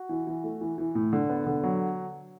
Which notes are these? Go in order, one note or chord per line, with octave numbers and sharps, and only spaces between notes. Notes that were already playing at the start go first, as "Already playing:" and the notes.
Already playing: F#4
E3
E3
A3
E3
E3
A2
D3
B3
D3
F#3